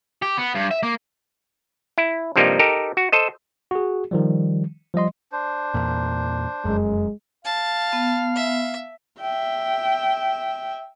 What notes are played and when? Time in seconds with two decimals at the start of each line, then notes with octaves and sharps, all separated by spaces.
0.22 G4
0.38 B3
0.55 G2
0.71 E5
0.83 A#3
1.98 E4
2.36 G2 C3 F3 G3 A#3 D#4
2.59 D#4 G4 A4 A#4
2.97 F#4
3.12 A4 C5 D#5
3.71 F#4 G#4
4.11 D#3 F3 G3
4.94 F3 G3 D#5 C6
5.32 D4 C5
5.74 E2 A#2
6.65 F1 F#2 G#3
7.45 F5 A5
7.93 B3
8.36 E5
9.20 E5 G5